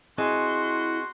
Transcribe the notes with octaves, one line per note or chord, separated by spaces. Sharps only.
C4 E4 F#4 G#4 D#5 C6